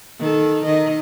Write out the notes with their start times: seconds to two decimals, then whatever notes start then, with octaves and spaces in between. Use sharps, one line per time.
0.20 D#3 A4
0.65 D#3 D#5